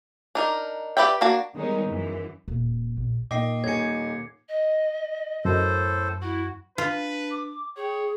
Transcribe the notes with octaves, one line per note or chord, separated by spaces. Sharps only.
D4 D#4 A#4
G4 B4 D5 E5 G5
A#3 D4 F#4 A5
D#3 G3 G#3 B3 C#4 D#4
F#2 E3
D#1
A#1
A#2 A#3 D#4 D#5 G5 D6 C7
D#1 D#4 C#5 G#5 G#6 C#7
D#5
F#2 A2 A4 C5
E4 F#4
D4 F4 B4
D6
G#4 C#5 G5